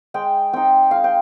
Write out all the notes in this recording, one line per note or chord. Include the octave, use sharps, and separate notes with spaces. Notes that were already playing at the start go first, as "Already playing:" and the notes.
G#3 G5
C4 D#4 G5
G#3 F5
G5